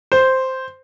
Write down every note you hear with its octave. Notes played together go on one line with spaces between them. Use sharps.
C5